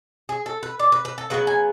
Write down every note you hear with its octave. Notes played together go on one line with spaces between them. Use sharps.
G#4
A4
B4
D5
B4
B4
A4
C#3 F#3 B3 B4
G#5